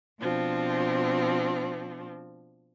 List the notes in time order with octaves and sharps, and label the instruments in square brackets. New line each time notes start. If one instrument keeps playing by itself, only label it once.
[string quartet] B2 F3 C4 D4